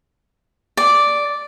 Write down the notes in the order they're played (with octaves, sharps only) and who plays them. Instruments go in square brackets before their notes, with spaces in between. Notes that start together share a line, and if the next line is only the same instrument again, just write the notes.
[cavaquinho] D5